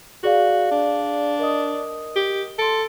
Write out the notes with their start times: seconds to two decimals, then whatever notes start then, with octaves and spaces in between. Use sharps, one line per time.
0.24 F#4 G#4 D5 F5
0.71 D4
1.39 A#4 D#5 D#6
2.16 G4
2.59 A4 C6 D7